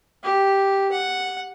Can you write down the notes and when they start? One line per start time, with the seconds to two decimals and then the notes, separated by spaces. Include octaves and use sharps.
0.23 G4
0.91 F#5